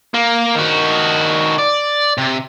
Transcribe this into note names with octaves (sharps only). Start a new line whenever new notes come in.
A#3
D#3 F#4
D5
C3